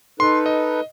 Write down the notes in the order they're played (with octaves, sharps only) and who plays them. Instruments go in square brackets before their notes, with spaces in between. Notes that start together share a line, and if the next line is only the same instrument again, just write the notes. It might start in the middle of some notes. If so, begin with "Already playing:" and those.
[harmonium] D#4 A4 B4 [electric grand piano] C6
[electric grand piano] D#5